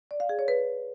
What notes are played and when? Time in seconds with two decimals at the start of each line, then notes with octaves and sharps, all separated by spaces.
0.11 D5
0.20 F5
0.29 G#4
0.39 C#5
0.48 B4